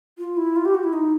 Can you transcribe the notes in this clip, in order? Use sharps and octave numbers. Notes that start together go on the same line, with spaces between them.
F4
E4
F4
G4
F#4
E4
D#4